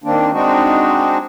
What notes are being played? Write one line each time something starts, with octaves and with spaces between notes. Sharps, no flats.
D#3 A#3 C4 D4
G#3 C4 D4 D#4 F#4